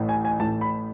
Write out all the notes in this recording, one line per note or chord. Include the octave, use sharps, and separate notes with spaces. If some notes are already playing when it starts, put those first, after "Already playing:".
Already playing: A1 A2 E3
G#5
G#5
A1 A2 E3 A5
B5